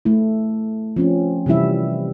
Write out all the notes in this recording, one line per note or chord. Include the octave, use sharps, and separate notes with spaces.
A3 E4
F3 C4 C#4
C3 E3 G3 E4 E5